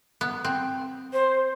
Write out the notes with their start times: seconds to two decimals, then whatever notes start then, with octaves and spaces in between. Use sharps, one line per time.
0.21 B3
0.45 C4
1.13 C5